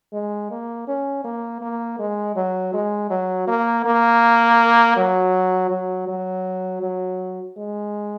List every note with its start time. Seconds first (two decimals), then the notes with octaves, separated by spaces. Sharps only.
0.13 G#3
0.51 A#3
0.88 C#4
1.25 A#3
1.61 A#3
1.99 G#3
2.36 F#3
2.73 G#3
3.10 F#3
3.48 A#3
3.85 A#3
4.97 F#3
5.70 F#3
6.08 F#3
6.82 F#3
7.57 G#3